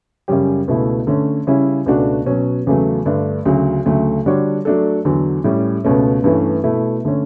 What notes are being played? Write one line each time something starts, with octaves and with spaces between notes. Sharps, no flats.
F#2 C#3 G3 C#4 G4
C#2 B2 A3 E4
D3 A3 C#4
C#3 G3 C#4 E4
C#2 B2 A3 D4 F#4
B2 F#3 C#4
E2 C#3 F#3 A3
G2 D3 A3 D4
D2 C#3 F#3
D2 C#3 F#3 A3
D3 G3 D4 F#4 C#5
F#3 A3 D4 A4
E2 D3 F#3
A2 G3 C#4
C#2 B2 A3 C#4
G2 E3 A3 C#4
B2 A3 E4
D3 A3 C#4